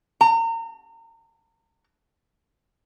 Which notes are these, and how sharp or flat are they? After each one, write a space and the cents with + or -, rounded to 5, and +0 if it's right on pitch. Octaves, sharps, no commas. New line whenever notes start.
A#5 -35